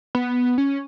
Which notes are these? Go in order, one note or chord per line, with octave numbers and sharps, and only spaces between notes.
B3
C#4